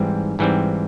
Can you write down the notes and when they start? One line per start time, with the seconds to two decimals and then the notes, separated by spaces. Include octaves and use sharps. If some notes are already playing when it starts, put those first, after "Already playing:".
Already playing: G#2 E3 G3 C4
0.39 G#2 E3 G3 C4